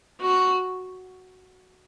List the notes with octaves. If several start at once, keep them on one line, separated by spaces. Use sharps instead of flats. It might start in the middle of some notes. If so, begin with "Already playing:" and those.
F#4